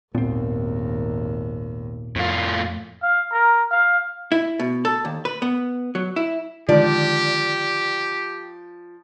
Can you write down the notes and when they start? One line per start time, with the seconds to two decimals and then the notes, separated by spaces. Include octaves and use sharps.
0.15 G#1 D#2 A#2 B3 C4
2.16 F2 A2 A3 F4
3.02 F5
3.31 A#4
3.72 F5
4.32 E4
4.59 B2
4.85 A4
5.05 D#2
5.25 B4
5.42 B3
5.95 F#3
6.16 E4
6.69 D3 D#3 F3 G#3 G4 D5